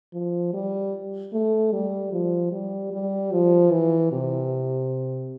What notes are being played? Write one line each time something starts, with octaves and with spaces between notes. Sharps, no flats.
F3
G3
A3
G3
F3
G3
G3
F3
E3
C3